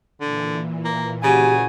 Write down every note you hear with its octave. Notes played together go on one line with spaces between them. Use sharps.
A#2 D3 E3
A#3
C#3 F#4 G4 G#5